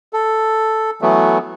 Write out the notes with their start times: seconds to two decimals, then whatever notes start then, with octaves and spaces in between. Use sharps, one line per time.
0.13 A4
1.02 E3 F#3 A3 B3